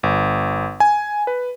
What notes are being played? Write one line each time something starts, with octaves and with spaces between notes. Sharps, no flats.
G1
G#5
B4